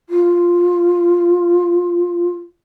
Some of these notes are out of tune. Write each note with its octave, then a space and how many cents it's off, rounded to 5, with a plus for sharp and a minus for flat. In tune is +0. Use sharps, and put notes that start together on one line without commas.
F4 +5